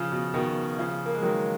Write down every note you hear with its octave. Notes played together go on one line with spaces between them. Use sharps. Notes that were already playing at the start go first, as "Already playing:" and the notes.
Already playing: C#3 F3
B2
B2 D#3
C#3 F3
A#3
G#3
D#3 F#3